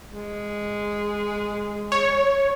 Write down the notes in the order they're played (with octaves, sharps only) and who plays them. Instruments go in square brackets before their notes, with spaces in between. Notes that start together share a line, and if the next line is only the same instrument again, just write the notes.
[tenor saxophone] G#3
[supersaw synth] C#5